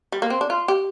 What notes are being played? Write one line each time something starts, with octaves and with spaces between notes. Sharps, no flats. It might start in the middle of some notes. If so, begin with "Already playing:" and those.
G3
A#3
C4
D4
F4
G4